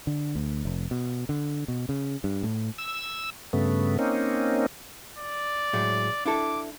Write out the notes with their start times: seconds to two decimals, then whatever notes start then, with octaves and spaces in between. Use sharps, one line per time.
0.07 D3
0.35 D2
0.65 F1
0.91 B2
1.29 D3
1.68 B2
1.89 C#3
2.24 G2
2.43 A2
2.78 E6
3.53 G2 C#3 A3 B3
3.99 A#3 C4 C#4 D#4
5.18 D5
5.73 A2 F#3 G#3
6.26 D4 E4 A4 D6